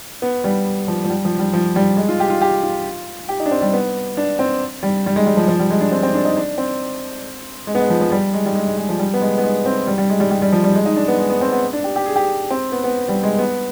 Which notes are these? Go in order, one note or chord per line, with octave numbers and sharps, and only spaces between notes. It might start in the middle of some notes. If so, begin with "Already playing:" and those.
B3
G3
F3
F3
G3
F3
G3
F3
G3
G#3
F4
G4
F4
G4
F4
G4
D#4
D4
C4
G3
B3
D4
C4
G3
G3
G#3
G3
F3
F3
G3
G#3
D4
C4
C4
D4
D#4
D4
C4
G#3
B3
G#3
F3
F3
G3
G#3
G3
G#3
G#3
G#3
F3
G3
B3
G#3
B3
G#3
C4
G3
G3
G#3
G3
G3
G3
F3
G3
G#3
D#4
D4
B3
G#3
B3
C4
B3
D4
G4
G4
G#4
G4
C4
B3
B3
G3
G#3
B3